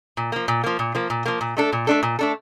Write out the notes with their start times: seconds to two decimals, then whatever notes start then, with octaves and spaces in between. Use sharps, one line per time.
0.17 A#2
0.32 F3 A#3
0.48 A#2
0.64 F3 A#3
0.79 A#2
0.95 F3 A#3
1.10 A#2
1.26 F3 A#3
1.41 A#2
1.57 A3 D4 A4
1.73 A#2
1.87 A3 D4 A4
2.03 A#2
2.19 A3 D4 A4